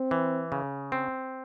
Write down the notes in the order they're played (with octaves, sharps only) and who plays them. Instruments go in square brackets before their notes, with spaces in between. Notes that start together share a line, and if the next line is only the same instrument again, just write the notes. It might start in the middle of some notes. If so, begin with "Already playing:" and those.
Already playing: [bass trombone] C4
[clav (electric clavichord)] E3
C#3
C4